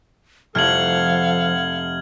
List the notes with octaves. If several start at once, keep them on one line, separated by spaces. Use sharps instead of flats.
F1 F3 A4 F5 F#5 F6 G#6 F#7